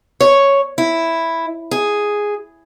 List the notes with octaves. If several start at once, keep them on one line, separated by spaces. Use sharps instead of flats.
C#5
E4
G#4